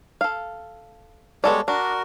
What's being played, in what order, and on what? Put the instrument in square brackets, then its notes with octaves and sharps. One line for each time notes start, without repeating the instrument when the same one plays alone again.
[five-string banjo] A4 F5
[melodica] G3 G#3 C#5 [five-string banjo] B3 A4 D5
[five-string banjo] D4 [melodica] F#4 A#4